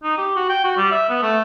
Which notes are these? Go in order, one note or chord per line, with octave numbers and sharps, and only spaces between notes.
D#4
G4
F#4
G5
F#4
G3
E5
B3
A3